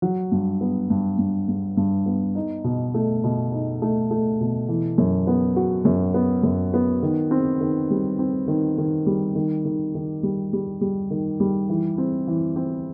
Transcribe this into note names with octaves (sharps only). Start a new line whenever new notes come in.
F#3
G2
B3
G2
G2
G2
G2
B3
D#4
B2
A3
B2
D#4
A3
A3
B2
E3
F#2
B3
F#4
F#2
B3
F#2
B3
D#3
C4
D#3
G3
C4
D#3
D#3
G3
D#3
D#3
D#3
G3
G3
G3
D#3
G3
E3
C4
E3
C4